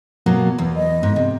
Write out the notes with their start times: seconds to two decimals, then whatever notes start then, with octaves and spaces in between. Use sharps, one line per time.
0.26 B2 F#3 A#3
0.58 E2
0.76 D#5
1.03 G#2
1.16 C3